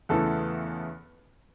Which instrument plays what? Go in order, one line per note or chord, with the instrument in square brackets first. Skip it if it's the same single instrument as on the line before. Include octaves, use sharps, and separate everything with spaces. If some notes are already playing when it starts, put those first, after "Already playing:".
[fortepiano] E2 C#3 E3 A3 A4